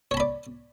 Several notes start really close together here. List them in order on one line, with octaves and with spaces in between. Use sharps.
C#5 A5 B5 D5